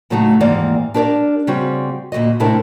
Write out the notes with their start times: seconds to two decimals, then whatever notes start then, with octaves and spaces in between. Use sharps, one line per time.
0.10 A2 C#3 F#3 A3 D#4 F#4
0.40 D#2 G#2 E3 A#3 D5
0.94 D4 G4 A#4 C5 D5
1.47 C#3 G3 C4 F#4
2.12 D2 A#2 F3 F#4 D#5
2.40 A2 C3 D4 E4 A4 A#4